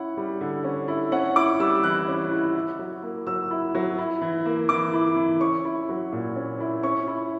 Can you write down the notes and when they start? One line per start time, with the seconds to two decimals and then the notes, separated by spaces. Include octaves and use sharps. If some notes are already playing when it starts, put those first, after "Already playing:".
Already playing: C#4 E4 F#5
0.17 G3
0.41 D3
0.64 C#4
0.88 E4
1.12 C#4 F#5
1.36 E4 D6
1.60 G3 E6
1.83 E3 F#6
2.08 C#4
2.31 E4
2.55 E4
2.79 F#3
3.03 A#3
3.27 F#3 E6
3.51 E4
3.75 F#3
3.98 E4
4.21 E3
4.45 A#3
4.69 E3 D6
4.93 E4
5.16 E3
5.41 C#4 C#6
5.65 E4
5.89 F#3
6.12 A#2
6.36 C#4
6.60 E4
6.83 C#4 C#6
7.07 E4